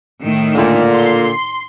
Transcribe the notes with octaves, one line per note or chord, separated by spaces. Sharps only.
A2 D#3
A#2 D3
C6